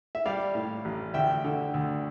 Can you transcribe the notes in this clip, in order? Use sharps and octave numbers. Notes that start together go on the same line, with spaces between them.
E5
G3 D5 F5
A2
A1
D2 E5 G5
D3
D2